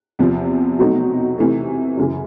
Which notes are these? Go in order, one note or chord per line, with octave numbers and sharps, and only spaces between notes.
E2 C3 F3
B2 F#3 A3 C4 D#4
C3 E3 A3
F#2 C#3 E3